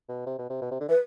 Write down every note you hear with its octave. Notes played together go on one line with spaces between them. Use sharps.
B2
C3
B2
C3
B2
C3
D3
E3 B4